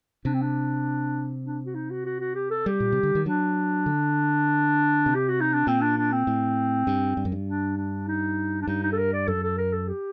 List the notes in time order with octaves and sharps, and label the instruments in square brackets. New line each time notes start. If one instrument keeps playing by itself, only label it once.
[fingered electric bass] C3 [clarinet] D4
[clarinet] C4
D4
D4
F#4
D#4
F#4
F#4
F#4
G4
A4
[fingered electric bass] G3 [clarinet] G4
[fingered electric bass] A#2
C3
D3
D#3
[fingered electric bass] F#3 [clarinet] D4
[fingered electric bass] D3
C3
[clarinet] G4
F#4
D#4
D4
[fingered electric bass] A#2 [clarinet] C4
[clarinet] D4
D4
C4
[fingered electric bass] A2
G2
G2
F#2
G2
[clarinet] D4
D4
D#4
D4
[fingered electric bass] G2 [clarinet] D#4
[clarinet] D#4
A4
A#4
D5
[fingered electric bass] F#2 [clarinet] A4
[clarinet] A4
A#4
A4
G4